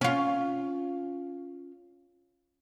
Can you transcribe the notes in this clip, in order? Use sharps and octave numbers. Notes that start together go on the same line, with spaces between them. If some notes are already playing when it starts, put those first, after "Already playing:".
C#4 F4